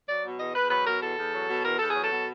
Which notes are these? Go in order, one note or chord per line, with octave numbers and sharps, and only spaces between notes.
F#3 D5
B2
E2 D#5
E2 B4
F#3 B4
B2 A#4
E2 A4
E2
F#3
B2
E2 A#4
E2 A4
F#3 G#4
A4
B2